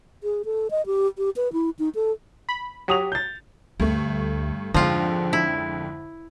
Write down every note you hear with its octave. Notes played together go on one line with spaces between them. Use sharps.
G#4
A4
D#5
G4
G4
B4
E4
D#4
A4
B5
F#3 G4 D#6 F7
G6 A6
D2 G2 A3
F2 G#2 D3 F3 D4 F4
E4